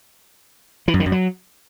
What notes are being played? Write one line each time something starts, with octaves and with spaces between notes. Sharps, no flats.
E3
F#2
D#3
F#2
F#3